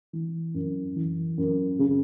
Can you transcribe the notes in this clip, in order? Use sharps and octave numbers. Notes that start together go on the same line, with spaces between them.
E3
F#2
E3
F#2
C#3